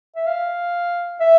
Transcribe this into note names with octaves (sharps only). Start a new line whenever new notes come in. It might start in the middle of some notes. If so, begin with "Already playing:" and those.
E5
F5
E5